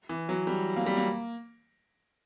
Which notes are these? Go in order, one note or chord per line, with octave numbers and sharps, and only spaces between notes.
E3
F#3
G3
A#3
G3
A#3